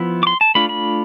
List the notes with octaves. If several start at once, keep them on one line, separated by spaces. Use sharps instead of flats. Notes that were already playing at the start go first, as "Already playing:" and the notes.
Already playing: F3 B3 E4
D6
C6
A5
A3 D4 F4 B5
B5